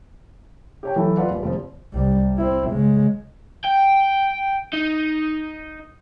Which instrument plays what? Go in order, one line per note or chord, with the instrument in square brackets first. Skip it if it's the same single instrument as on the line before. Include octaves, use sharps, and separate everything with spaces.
[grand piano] G4 C#5 G5
E3 F#3 E4 A4
F4 B4 D5 F#5
D#1
F1 F3
[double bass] C2 G3
C4 E4
C#3 G#3
[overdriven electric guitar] G5
D#4